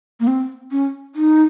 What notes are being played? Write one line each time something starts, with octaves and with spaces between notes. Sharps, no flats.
A#3
C4
C#4
D#4